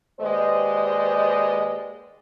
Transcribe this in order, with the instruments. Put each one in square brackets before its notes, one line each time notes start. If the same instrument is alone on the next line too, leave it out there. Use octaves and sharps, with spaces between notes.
[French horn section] D#2 G#3 B4 C5 D5 D#5